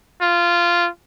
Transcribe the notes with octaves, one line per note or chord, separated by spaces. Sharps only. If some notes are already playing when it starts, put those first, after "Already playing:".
F4